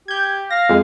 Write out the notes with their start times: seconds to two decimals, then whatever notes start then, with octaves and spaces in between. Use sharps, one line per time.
0.08 G4 G6 G#6
0.51 F5 A#6
0.69 F2 G#3